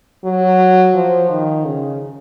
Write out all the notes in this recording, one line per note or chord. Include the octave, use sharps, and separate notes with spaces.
F#3
F3
D#3
C#3